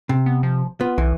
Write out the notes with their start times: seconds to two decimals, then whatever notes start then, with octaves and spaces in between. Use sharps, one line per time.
0.09 C3
0.26 B3
0.43 F3
0.81 B3 F4
0.98 B1 E3